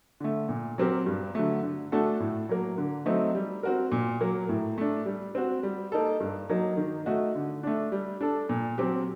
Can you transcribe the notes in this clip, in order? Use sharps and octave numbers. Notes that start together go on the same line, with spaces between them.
D3 A3
A#2
F#3 C4 G4 A#4
G2
D3 F#3 A3
D3
A3 D4 F#4 A4
A2
F#3 A#3
D3
F#3 A3 C4 D#4
G3
C4 F#4 A#4
A#2
F#3 A#3
A2
A3 D4
G3
C4 F#4
G3
A#3 D#4 A4
G2
F#3 A#3 D#4
D#3
A3 D#4 F#4
D3
A3 D4
G3
D4 A4
A#2
F#3 C4 G4